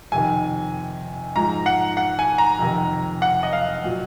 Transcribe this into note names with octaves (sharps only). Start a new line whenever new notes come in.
F2 C3 D#3 G#5
G#2 F3 A#5
F#5
F#5
G#5
A#5
F2 C3 D#3
F#5
D#5
F5
A#2 F#3